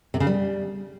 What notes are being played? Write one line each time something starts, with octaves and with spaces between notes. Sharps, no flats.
C3
C#3
G3